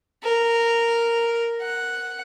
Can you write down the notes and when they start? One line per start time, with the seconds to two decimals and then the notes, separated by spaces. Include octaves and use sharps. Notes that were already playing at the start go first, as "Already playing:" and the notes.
0.23 A#4
1.61 F#5